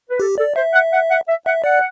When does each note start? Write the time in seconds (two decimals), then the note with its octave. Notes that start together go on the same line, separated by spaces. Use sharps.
0.10 B4
0.20 G4 A4
0.38 A4 D5
0.56 C5 E5
0.73 F#5
0.92 F#5
1.10 F#5
1.28 E5
1.46 E5 F#5
1.64 D5 F#5